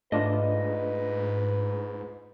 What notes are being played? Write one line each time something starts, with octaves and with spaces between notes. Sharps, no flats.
G#2 A3 D4 F4 B4 D#5